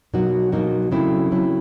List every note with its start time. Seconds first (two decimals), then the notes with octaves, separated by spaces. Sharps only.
0.14 B2 F#3 A#3 D#4 F#4
0.52 B2 F#3 A#3 D#4 F#4
0.91 C#3 F#3 A3 C4 E4
1.31 C#3 F#3 A3 C4 E4